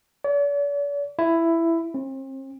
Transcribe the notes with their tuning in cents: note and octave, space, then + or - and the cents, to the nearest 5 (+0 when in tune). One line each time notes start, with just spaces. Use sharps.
D5 -45
E4 +10
C4 +40